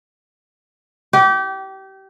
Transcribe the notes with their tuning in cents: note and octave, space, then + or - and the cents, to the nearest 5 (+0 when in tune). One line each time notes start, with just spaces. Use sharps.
G4 -25